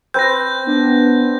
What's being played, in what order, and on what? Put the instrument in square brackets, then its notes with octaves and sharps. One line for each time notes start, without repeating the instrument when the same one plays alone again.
[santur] C4 B4 [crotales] G6 A#6
[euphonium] B3 [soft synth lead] D4